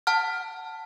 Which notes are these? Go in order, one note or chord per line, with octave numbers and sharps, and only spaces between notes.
F#5 A5 F6